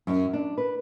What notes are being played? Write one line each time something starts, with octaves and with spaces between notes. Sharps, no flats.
F#2
D4
B4